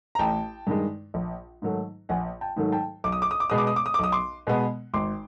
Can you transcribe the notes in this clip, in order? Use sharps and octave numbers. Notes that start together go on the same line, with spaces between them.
A#5
A1 G5 A5
G2 D#3 G#3
A#1
G#2 D#3 F#3 A3
A#1 F#5 G#5
G5 A5
G#2 D#3 F#3 A3
G5 A5
B1 D6
D#6
D6
D#6
D6
B2 G#3 B3 D#6
D6
D#6
D6
D#6
D6
B1 D#6
C6 D6
B2 G#3 B3
G#1 C6 D6